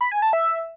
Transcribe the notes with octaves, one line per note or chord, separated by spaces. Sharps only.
B5
G#5
A5
E5